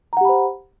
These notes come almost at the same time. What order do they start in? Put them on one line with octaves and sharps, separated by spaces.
A#5 F#5 G4 B5 C5